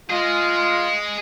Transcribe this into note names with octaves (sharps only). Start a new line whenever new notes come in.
F4 G#4 D#5